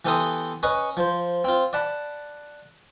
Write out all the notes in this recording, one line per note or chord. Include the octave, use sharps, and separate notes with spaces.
E3 B3 G4 A4 C6 D#6
C#4 B4 D#5 C#6
F3 C5
C4 F4
D5 F#5 A5 B5